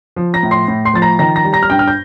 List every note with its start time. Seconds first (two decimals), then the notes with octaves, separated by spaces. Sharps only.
0.16 F3
0.34 A#5 A#6
0.43 A2
0.51 C6 C7
0.68 A2
0.85 C6 C7
0.94 F3 A6
1.02 A#5 A#6
1.19 D#3 A#5 A#6
1.36 A#5 A#6
1.44 G3
1.53 A#5 A#6
1.63 F6
1.70 G2 G5 G6
1.79 F6
1.88 G6